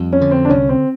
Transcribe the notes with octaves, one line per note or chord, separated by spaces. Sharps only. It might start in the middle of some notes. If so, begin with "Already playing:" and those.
Already playing: F2 G3
C#4
D3
C4
D4
C2 C#4
C4